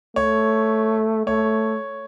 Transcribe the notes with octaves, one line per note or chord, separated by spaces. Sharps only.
A3 C#5
A3 C#5